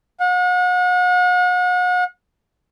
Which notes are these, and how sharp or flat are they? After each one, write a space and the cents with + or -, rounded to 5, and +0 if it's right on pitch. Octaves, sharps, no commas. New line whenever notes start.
F#5 -40